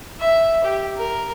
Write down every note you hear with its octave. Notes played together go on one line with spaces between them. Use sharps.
E5
G4
A#4